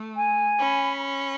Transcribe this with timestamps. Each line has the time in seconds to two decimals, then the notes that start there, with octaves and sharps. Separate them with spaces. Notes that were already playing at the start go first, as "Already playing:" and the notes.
Already playing: A3
0.15 G#5
0.59 C#4 B5
1.03 B5